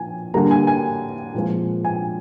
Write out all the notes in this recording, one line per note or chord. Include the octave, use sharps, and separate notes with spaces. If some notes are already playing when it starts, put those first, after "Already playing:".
Already playing: A#2 F3 F4 G#5
D3 G3 A#3 A#5
G#5
G#5
A#2 F3 G#3 C4 F4
G#5